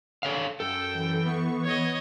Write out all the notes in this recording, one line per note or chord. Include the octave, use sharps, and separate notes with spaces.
A4 C#5 F5
F#2 A4 G5
E3
B3 C#6
C#5 D#5